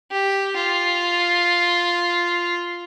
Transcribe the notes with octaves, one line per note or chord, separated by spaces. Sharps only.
G4
F4